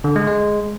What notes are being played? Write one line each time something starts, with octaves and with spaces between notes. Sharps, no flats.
D3
G#3
G#3